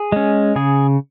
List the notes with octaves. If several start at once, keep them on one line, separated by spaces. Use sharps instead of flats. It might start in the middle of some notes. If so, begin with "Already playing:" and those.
Already playing: G#4
G#3 C#4
C#3 G#4